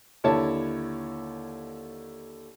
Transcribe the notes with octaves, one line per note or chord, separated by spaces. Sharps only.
D#2 D3 E4 C#5 A5